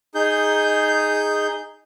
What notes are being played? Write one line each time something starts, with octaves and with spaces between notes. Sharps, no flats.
D#4 G#4 G6